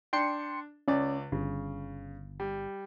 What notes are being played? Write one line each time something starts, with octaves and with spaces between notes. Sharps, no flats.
D4 G5 C6 C#7
C#2 C#4 D5
G1 C#3
G3